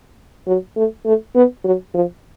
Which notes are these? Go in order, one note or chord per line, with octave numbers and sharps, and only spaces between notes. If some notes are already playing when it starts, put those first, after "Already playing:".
F#3
A3
A3
B3
F#3
F3